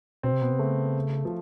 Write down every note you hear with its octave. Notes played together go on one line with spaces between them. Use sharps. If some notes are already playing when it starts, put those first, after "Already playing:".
B2 C4
C3
B2 B3
C3
C#3 A3
F3